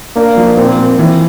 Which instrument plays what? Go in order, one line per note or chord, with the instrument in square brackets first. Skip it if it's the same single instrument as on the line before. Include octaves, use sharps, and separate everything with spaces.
[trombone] A#3 [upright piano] D4
[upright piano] F3
[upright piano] A#2 [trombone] C4
[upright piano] A#2
E3